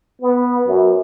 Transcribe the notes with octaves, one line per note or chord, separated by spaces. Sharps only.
B3
F#2